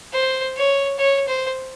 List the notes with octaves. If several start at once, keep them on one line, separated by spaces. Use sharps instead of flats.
C5
C#5
C#5
C5